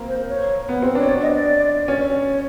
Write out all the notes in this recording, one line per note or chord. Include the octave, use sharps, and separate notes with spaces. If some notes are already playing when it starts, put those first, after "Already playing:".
Already playing: A#3 C4
C5
C#5
B3
C4
D4 C#5
D5
D#5
D5
C#4
C#5